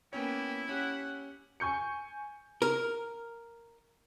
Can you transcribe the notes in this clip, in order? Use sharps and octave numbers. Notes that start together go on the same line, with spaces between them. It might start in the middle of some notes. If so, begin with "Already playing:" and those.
A#3 B3 C#4 E4 C#5 G5
C#4 G4 F#5
G#5 C#6 G6 C#7
A#4